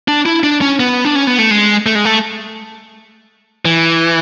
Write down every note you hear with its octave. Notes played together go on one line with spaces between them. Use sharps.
D4
E4
D4
C#4
B3
D4
C#4
B3
A3
G#3
A3
G#3
A3
E3